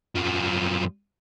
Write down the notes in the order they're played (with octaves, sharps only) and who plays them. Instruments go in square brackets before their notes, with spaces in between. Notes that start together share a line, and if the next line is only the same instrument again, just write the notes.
[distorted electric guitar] F#2 F3